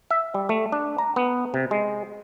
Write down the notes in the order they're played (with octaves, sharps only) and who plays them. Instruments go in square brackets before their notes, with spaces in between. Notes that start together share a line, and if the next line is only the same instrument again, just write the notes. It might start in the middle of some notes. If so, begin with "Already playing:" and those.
[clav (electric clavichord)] E5
G3
A3
D4
A#5
B3
C3
G#3